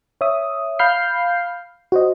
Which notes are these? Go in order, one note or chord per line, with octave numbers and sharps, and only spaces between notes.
C#5 E5 D#6
F5 B5 F6 G6 C7
F#4 C5 D#5